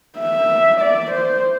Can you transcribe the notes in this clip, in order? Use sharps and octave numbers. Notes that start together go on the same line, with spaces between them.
E5
D5
C5